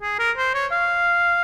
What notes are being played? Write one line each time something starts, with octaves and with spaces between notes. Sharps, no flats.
G#4
A#4
C5
C#5
F5